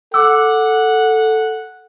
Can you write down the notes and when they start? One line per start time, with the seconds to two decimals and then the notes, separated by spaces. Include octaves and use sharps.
0.14 A4 F#5 D6 E6